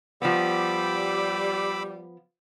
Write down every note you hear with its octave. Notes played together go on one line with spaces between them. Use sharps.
F3 G3 B3 B5 D6 E6